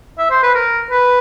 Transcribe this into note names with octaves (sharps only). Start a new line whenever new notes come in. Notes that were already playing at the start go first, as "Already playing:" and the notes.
E5
C5
B4
A#4
B4